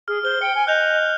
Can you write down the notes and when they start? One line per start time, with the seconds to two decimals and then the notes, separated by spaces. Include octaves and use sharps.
0.08 G#4 F6
0.23 C5 F6 G7
0.42 G5 C#7
0.55 G#5
0.67 D#5 F#6 G6 F7